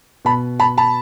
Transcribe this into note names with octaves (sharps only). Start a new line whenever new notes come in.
B2 A5 B5
A5 B5
A5 B5